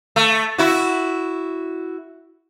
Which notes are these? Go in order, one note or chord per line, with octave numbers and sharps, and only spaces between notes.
A3
E4 F#4